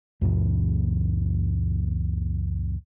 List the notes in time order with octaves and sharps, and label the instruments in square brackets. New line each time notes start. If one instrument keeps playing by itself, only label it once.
[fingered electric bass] C#2 F#2 A#2 E3